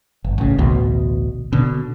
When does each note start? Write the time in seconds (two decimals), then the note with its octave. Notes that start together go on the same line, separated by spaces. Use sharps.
0.24 G1
0.38 A1 C#3
0.58 A1 D2 B2
1.52 B2 D3